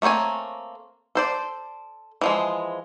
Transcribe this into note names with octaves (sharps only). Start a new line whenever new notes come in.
A3 A#3 C4 C#5 G#5
A4 C5 D5
E3 F3 G#3